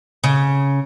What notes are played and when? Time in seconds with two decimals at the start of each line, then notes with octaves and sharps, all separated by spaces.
0.24 C#3